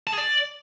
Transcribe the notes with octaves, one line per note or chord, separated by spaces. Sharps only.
A5
G#4
D5